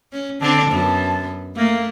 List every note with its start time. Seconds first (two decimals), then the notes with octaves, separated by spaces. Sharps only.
0.12 C#4
0.41 D3 C4 D4 A5
0.71 F#2 B3
1.56 A3 A#3